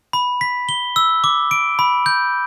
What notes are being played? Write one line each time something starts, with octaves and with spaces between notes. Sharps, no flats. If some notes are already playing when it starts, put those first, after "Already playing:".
B5
B6
G7
E6
D6
D7
B5
G6